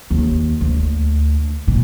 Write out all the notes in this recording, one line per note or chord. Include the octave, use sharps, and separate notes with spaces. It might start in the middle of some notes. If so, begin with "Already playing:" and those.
D#2
D2
A#2